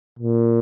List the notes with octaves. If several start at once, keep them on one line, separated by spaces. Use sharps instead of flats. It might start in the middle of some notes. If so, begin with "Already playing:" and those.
A#2